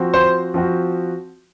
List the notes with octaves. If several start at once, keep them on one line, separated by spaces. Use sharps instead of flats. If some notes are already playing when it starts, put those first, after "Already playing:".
Already playing: F3 C4 F#4
C5
F3 C4 F#4